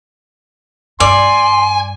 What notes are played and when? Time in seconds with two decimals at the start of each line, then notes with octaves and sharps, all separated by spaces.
1.00 G2 D5 G#5 C6